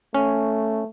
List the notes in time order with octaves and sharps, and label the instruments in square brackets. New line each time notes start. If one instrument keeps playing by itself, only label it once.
[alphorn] A3 [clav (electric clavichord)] C#4